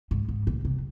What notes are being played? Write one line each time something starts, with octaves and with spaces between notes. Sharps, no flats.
G#2
G#2
A#2
C3